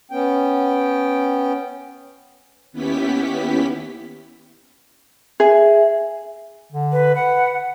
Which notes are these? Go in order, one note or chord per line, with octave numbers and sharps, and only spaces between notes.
B3 C#4 G5
D#2 B3 C#4 E4 G4 B6
G#4 E5
D3
B4
B4 F#5